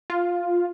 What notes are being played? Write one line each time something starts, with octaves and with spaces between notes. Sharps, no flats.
F4